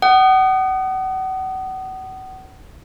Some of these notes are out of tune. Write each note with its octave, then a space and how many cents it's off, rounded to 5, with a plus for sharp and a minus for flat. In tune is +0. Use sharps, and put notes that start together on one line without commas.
F#5 +35 D#6 -20